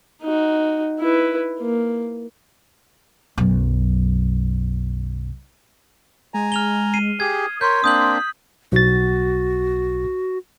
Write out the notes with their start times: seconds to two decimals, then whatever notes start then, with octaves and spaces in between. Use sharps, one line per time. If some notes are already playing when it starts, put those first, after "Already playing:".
0.22 D#4 F#4
1.00 E4 B4
1.60 A#3
3.38 B1 F#2
6.34 G#3 G#5 A#5
6.52 F6 F7 G7
6.94 C7 D#7
7.20 G4 G#4 D#6 G#6
7.61 A#4 C#5 C6 G6 B6
7.84 A#3 C4 D4 D#6 G6 F#7
8.72 B1 F#4 A6